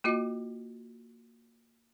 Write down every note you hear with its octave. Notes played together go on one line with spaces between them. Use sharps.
A#3 F4 F#4 D#5